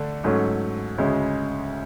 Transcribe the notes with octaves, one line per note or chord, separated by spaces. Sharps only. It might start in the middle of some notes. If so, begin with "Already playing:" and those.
Already playing: D3 A3 D4
G#2 F#3 A3 C#4
D2 C#3 G#3 C#4